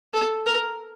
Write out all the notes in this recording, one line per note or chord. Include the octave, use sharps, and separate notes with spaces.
A4
A#4